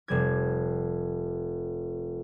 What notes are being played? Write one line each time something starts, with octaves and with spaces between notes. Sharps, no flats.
F1 G3 G#6